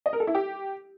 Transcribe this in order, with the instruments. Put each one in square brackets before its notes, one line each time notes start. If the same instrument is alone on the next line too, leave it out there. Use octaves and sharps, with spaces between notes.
[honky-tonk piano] D#5
A#4
A4
E4
G4